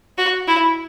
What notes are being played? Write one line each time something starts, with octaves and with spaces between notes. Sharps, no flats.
F#4
E4